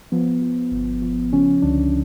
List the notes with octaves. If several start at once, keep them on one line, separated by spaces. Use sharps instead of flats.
F3 B3
F3
G1
F3
C#3 F3 C#4
C#2 D3 D4